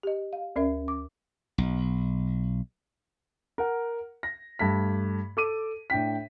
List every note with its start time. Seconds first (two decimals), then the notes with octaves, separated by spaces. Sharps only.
0.03 G4 D#5
0.33 F5
0.56 D2 C#4 A#4 E5
0.88 D6
1.58 B1
3.58 A#4 F#5
4.23 A#6
4.59 G2 A3 B6
5.37 A4 D6 D#7
5.90 A2 D4 G5 B6